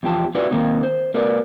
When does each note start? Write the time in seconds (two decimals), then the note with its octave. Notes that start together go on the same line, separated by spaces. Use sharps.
0.03 E2 F3 G4 A5
0.35 C#4 E4 F#4 B4 D5
0.51 D#3 A#3 C4 D#4
0.83 C5
1.14 A#3 A#4 B4 D5